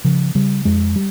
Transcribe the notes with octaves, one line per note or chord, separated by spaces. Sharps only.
C#3 F3
C#3 G3
F2 G#3
G3